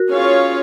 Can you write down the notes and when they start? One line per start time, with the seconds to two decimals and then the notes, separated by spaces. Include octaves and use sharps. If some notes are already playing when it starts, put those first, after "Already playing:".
Already playing: F#4 A#4
0.09 C#4 F4 G#4 C#5 F5